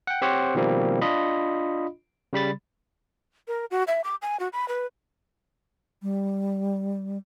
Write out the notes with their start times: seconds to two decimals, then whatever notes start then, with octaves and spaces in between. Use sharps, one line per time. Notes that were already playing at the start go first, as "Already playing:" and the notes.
0.07 F#5 G5
0.22 C4 G4 C5 C#5 F#5
0.55 B2 D#3 F3 G3 A#3 C4
1.02 D4 F4 D#5 B5
2.33 C#3 G3 B5 A6
3.48 A#4
3.71 F#4
3.87 E5
4.04 D6
4.22 G#5
4.40 F#4
4.53 B5
4.68 B4
6.03 G3